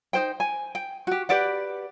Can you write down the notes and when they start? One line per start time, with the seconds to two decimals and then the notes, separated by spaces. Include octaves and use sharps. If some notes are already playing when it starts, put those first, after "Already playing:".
0.13 D#4 C5 G5
0.40 G#5
0.75 G5
1.07 F#4 G4
1.29 G4 B4 D5 F#5